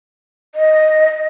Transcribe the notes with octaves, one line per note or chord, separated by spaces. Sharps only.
D#5